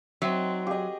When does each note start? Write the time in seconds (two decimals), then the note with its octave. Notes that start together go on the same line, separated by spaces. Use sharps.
0.22 F#3 C4 D#4 E5
0.67 G4 G#4 D#5 F5